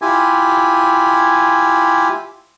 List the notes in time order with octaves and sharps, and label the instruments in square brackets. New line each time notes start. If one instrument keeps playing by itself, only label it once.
[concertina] E4 F4 G4 G#5